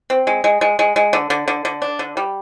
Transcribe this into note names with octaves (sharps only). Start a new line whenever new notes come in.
C4
G#3
G#3
G#3
G#3
G#3
D3
D3
D3
D3
D4
D3
G3